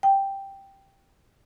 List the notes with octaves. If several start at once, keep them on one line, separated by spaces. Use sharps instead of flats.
G5